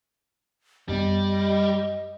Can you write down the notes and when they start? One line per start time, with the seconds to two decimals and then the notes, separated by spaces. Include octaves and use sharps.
0.89 F#2 G3 B3 D#5